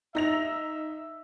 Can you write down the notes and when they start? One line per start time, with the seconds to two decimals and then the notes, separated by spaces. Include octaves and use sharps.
0.15 D#4 E5 A#6 F7